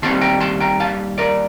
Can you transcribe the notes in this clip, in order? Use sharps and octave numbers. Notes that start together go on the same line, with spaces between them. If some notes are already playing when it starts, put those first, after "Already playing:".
D#2 D#3 G3 C4 A5 C6
G5 A#5
A5 C6
G5 A#5
F5 A5
A#4 D5